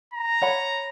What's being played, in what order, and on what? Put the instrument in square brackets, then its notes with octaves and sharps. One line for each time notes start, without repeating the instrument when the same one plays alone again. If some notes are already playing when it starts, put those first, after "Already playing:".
[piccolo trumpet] A#5
[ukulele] C#5 F#5 B5